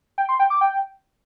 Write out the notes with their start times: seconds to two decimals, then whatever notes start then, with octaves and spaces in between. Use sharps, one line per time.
0.18 G5
0.29 C6
0.39 G5
0.50 D6
0.61 G5